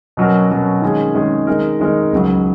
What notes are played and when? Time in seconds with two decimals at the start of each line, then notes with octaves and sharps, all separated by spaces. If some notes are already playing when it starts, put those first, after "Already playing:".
0.17 B2 F#3 C#4 F#4 A#4
0.50 B2 F#3 C#4 F#4 A#4
0.82 D#3 G#3 C#4 G#4
1.15 D#3 G#3 C#4 G#4
1.47 D#3 G#3 D#4 A#4
1.80 D#3 G#3 D#4 A#4
2.12 C#2 C#3 F#3